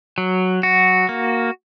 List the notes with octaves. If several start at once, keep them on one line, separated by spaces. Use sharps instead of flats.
F#3
F#4
A#3